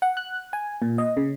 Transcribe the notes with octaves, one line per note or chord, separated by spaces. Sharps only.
F#5
F#6
G#5
A#2
D#5
C#3